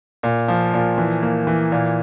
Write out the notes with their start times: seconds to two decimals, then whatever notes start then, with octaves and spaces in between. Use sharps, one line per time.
0.23 A#2
0.48 F3
0.74 A#2
0.98 E3
1.22 A#3
1.47 E3
1.72 A#2